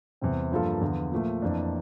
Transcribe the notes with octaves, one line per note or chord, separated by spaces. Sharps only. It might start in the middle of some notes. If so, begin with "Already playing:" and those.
E2 C3 G3 C4
G2 F3 A#3 F4 A4
E2 D3 F3
A#2 F3 A3
F2 E3 A#3 D4